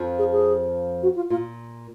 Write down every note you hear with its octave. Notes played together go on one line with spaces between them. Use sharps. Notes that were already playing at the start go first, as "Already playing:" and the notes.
Already playing: F2 F3
G#4
G#4
F#4
F4
A#2 F4